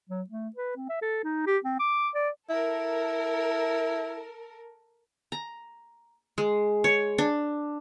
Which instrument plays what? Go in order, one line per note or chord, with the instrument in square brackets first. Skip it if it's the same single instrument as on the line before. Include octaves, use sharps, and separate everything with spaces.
[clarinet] F#3
A3
B4
C4
E5
A4
D#4
G4
C4
D6
D5
[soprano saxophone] E4 [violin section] A4 A#4
[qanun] A#5
G#3
C#5
D4